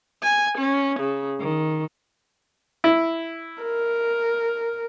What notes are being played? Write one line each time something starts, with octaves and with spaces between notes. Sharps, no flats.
G#5
C#4
C#3
D#3
E4
A#4